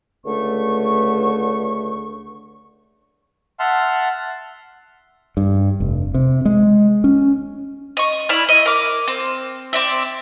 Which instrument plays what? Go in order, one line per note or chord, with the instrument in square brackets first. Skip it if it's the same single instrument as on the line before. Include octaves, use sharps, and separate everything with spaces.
[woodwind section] C#2 D3 A3 C#6
[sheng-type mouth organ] E5 F#5 A5 C6 F6
[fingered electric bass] G2
F1
C3
G#3
C#4
[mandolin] D#5 C#6
E4 D5 F6
D#5 E5
A#4 D6
C4
C4 D5 E5